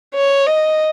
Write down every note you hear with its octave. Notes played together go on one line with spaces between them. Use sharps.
C#5
D#5